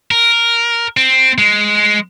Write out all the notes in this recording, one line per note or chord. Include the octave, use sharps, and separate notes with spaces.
A#4
C4
G#3